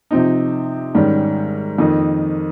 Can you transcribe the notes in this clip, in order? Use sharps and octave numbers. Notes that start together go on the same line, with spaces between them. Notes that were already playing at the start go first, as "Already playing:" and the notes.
C3 F3 C4 D#4
G#2 D#3 G3 C#4
F2 D#3 A#3 D#4